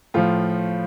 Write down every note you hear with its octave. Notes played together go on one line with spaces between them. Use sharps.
A2 F3 F4